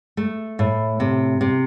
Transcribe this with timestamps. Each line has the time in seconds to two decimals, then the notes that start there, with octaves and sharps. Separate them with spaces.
0.17 A3
0.59 A2
1.00 C3
1.41 C3